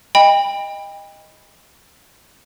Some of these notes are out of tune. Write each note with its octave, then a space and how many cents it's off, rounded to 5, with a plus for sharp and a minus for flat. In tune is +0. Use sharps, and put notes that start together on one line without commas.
D#5 +0 G5 +35 B5 +0